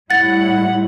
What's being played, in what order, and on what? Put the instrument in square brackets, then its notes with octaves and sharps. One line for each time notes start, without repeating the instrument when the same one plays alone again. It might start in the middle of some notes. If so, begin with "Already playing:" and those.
[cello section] A2 G3 E4 [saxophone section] F#5 [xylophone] A6